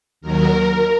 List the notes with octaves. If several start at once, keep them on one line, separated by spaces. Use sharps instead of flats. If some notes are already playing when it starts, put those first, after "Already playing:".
D#2 D#3 F#3 A#4